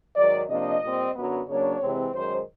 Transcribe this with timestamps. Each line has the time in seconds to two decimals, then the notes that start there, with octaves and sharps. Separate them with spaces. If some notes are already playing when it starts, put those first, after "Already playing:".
0.15 G#2 D#3 F#3 D5
0.49 C3 F3 A#3 D4 D#5
0.82 A#2 G3 C4
1.15 F#2 D3 F#3 B3
1.48 C#3 F#3 A#3 D4 C#5
1.81 C3 E3 G#3 C4
2.14 F#2 D#3 G#3 C5